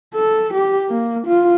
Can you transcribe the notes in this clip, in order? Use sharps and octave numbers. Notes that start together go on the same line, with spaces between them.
A4
G4
A#3
F4